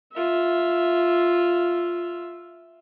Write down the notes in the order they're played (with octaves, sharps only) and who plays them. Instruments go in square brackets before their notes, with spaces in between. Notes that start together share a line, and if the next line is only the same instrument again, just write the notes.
[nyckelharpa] F4 E5